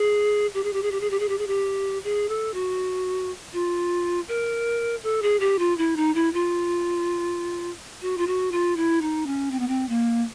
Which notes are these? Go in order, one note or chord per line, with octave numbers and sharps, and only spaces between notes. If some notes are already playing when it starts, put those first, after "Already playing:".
Already playing: G#4
G4
G#4
G4
G#4
G4
G#4
G4
G#4
G4
G#4
G4
G#4
A4
F#4
F4
A#4
A4
G#4
G4
F4
E4
D#4
E4
F4
F#4
F4
F#4
F4
E4
D#4
C#4
C4
B3
C4
A#3